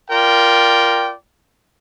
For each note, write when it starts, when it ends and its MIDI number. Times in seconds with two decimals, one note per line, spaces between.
0.10 1.13 65
0.10 1.13 70
0.10 1.13 74
0.10 1.13 79